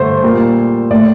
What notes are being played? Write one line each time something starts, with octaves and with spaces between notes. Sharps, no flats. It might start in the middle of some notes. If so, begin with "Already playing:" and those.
Already playing: G2 D3 A3 C5
A#2 G3 A#3
A2 A3 D5